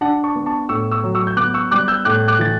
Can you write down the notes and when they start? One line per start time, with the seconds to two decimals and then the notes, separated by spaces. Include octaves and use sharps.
0.01 D4 F#5 A5
0.24 A5 C#6
0.36 B3
0.46 A5 C#6
0.69 A2 C#6 E6
0.91 C#6 E6
1.04 F#3
1.15 C#6 E6
1.27 G6
1.37 B3 D6 F#6
1.54 C#6 E6
1.71 G3 D6 F#6
1.88 E6 G6
2.05 A2 D6 F#6
2.28 D6 F#6
2.39 E3 A6